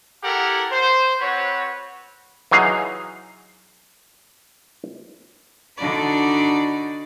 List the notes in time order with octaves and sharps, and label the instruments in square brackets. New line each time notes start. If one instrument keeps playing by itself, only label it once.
[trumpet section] E4 G4 A4 A#4 F#5
C5
C4 F#4 B4 C#5
[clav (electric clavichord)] E3 F#3 D#4 G#4 F5
[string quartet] D3 D4 D#4 F#4 D5 B5